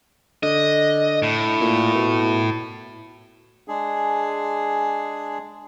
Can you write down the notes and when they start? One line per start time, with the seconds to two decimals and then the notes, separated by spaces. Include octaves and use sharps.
0.43 D3 D#5
1.23 A2
1.61 A#2
1.95 B2
3.68 G#3 D4 G#4